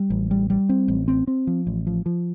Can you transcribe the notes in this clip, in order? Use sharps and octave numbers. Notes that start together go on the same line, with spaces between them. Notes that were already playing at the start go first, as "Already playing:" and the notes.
Already playing: G3
A1
G3
G3
C4
A1
C4
C4
F3
A1
F3
F3